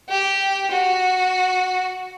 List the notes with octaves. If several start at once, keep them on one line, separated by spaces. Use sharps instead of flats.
G4
F#4